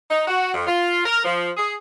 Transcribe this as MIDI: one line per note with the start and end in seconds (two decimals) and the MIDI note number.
0.10 0.26 63
0.27 0.51 66
0.54 0.67 41
0.67 1.04 65
1.05 1.24 70
1.24 1.50 53
1.57 1.74 68